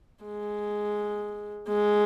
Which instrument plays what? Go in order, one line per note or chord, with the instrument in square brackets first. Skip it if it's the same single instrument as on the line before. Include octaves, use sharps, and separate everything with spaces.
[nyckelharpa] G#3
G#3